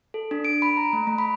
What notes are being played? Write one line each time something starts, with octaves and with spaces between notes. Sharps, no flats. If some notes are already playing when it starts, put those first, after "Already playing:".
A4
D4
D7
B5
A#5
A3
A3
B5